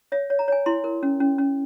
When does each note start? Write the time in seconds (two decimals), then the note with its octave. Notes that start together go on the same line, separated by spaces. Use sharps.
0.12 C#5 E5
0.30 C#5
0.39 A#5
0.48 C#5 G#5
0.66 E4 C6
0.84 A#4
1.03 C#4
1.20 C#4
1.38 C#4